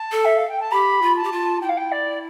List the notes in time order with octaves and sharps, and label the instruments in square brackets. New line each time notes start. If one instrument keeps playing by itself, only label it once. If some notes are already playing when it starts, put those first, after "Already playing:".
Already playing: [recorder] A5
[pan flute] A4
[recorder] E5
F5
G5
A5
[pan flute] G4 [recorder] B5
[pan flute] F4
[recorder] A5
[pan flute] G4
F4
[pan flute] E4 [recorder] G5
[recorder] F5
G5
D5